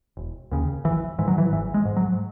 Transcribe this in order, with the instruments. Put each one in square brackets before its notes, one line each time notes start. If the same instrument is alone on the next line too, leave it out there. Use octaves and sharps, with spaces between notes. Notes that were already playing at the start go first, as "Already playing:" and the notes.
[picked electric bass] E1
D#2 C#3
G#1 E3
G#2 E3
F#3
E3
G#1 E3
G#3
G#2
F#3